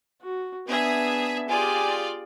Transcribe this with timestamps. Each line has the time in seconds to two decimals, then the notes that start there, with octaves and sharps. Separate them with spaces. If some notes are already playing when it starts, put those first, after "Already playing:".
0.22 F#4
0.67 B3 D4 G#4 E5
1.49 F4 G4 G#4 D5 G#5